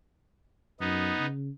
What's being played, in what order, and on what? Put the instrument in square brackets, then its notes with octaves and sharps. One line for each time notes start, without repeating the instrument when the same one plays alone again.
[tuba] F#2 [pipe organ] B3 D#4
[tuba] C#3